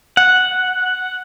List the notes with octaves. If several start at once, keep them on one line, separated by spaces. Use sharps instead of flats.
F#5